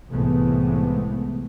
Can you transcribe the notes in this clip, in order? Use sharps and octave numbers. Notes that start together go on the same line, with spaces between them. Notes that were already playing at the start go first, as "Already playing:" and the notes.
C2 A2 E3 G#3 A3 B3